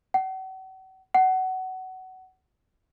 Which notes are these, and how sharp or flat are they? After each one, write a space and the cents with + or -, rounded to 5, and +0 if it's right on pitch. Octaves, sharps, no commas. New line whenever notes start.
F#5 +40
F#5 +20